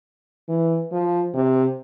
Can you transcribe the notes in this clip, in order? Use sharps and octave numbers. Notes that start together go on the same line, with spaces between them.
E3
F3
C3